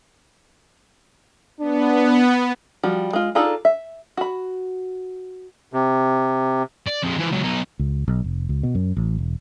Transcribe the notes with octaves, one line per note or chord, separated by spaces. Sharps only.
B3 D4
F3 G3 F#4
G#3 F4
D4 D#4 F4 G#4 A4
E5
F#4 B5
C3
D5
F2 G#3
E3 F3
C#2 F#3
B1 D#4
C#2
B1
F1
C#2
B2
F#2
A1
E1